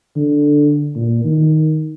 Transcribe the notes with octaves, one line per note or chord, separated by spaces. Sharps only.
D3
A#2
D#3